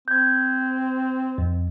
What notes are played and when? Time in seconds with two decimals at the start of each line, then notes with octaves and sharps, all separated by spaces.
0.08 C4 G6 G#6
1.38 F2